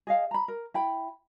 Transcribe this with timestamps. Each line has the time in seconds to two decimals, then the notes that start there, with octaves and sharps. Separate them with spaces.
0.07 G#4 D#5 F5
0.31 A#5 B5
0.48 A#4
0.74 E4 G5 B5